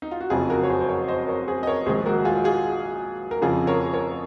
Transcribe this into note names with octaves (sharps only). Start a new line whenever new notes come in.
D#4
F4
F#4
F#1 F2 C#3 F3 F4 G#4
F#4 A#4
C#5
G#4 C5
C5
A#4 C#5
C5 D#5
A#4 C#5
G#4 C5
D#5
A#4 C#5
A#1 G#2 D#3 G#4 C5
F#4 A#4
F4 G#4
F4 G#4
A#4
F2 C#3 F3 F4 G#4
A#4 C#5
A#4 C#5